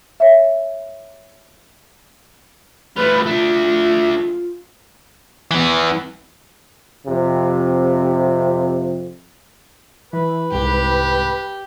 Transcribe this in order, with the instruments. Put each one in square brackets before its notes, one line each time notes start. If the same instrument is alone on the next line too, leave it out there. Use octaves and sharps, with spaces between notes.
[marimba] C#5 E5
[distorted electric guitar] A3 F4 [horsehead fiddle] B4
[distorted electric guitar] A3 D4 [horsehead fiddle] F4
[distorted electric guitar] E3 B3
[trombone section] F2 C3
[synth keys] E3 [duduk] B4
[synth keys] C2 G#2 [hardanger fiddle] G4